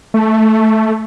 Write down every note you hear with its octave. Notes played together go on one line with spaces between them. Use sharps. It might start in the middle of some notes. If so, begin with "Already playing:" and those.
A3